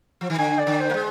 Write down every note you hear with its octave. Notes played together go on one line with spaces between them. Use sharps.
F3
D#3
D3 G#5
D5
D3
C5
A#3
G#3